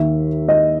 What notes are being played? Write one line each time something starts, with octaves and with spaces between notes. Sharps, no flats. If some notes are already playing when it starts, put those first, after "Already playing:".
Already playing: D#2 D#3 E5
D#5